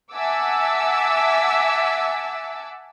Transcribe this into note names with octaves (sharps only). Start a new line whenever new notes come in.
E5 F#5 G#5 A5 D6 E6